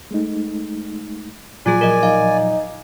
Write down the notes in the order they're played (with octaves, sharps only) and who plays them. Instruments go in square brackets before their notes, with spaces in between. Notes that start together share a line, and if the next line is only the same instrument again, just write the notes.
[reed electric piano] G#3 A3 D#4
[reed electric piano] A#2 F3 F#3 [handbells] F4 G#4 [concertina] D5 G#5
[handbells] A#4 D#5
[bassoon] D#4 [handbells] F5